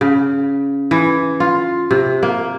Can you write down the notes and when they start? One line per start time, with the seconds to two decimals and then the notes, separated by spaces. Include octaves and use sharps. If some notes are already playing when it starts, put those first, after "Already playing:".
0.01 C#3
0.91 E3
1.40 F4
1.91 C3
2.23 A#3